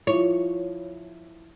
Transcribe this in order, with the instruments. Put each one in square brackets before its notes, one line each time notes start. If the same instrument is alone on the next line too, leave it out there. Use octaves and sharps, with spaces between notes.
[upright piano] F3 E4 [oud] C#5